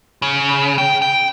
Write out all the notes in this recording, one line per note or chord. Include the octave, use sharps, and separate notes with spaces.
C#3
G5
G5